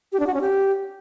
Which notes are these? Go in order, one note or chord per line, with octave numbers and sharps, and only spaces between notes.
G4
D4
F#4
C#4
G4